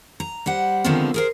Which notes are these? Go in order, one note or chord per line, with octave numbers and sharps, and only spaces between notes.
A#5
G3 C5 F#5
D3 D#3 F3 G#3 B3 C4
G#4 A#4 C5